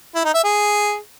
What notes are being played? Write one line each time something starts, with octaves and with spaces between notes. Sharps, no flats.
E4
D#4
E5
G#4